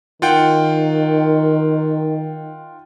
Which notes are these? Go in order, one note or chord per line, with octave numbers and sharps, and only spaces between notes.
D#3 F4 F#5 G5